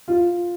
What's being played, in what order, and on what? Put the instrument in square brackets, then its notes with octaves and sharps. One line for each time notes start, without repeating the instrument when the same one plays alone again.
[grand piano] F4